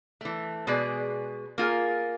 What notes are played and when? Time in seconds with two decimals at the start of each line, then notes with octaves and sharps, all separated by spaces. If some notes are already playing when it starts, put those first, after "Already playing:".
0.21 E3 A3
0.67 B2 G#3 G#4 B4 D5
1.58 A#3 F4 G#4